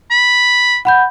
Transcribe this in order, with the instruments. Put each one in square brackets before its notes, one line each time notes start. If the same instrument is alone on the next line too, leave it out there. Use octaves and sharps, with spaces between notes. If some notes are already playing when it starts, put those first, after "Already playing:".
[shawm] B5
[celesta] F#5 B5 G6